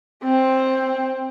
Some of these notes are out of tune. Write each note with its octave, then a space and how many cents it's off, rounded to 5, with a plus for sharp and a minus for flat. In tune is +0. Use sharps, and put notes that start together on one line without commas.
C4 +10